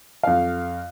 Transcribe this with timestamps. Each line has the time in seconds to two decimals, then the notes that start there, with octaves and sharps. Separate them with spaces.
0.23 F2 F5